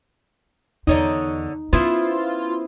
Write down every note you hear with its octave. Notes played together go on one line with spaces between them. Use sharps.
E2 D3 D#4 C#5 D#5
B3 C#4 E4 F4 C5